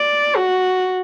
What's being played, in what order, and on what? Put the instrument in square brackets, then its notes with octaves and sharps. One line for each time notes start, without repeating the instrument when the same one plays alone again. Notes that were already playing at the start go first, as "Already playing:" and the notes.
Already playing: [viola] D5
F#4